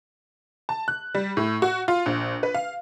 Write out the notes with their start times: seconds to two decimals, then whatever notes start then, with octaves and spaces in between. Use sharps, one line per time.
0.69 A5
0.88 F#6
1.15 G3
1.37 A2
1.62 F#4
1.88 F4
2.06 A#1
2.43 B4
2.54 F5